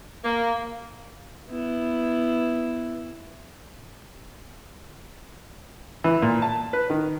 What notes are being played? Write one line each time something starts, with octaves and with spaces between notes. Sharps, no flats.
A#3
B3 E4
E3
A#2
A5
B4
D#3